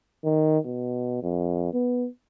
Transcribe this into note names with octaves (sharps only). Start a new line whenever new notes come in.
D#3
B2
F2
B3